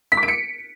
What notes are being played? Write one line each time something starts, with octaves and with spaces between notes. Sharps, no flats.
B6
D6
D7
C#7